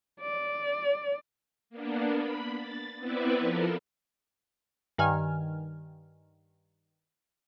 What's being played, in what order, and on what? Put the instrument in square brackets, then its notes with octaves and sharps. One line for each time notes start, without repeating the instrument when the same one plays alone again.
[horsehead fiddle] D5
[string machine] A#3 B3 D4
B5
A6
B3 C4 E4 B4 D5 E5
F3 A4 A#4
[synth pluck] G2 D#3 G#5 F6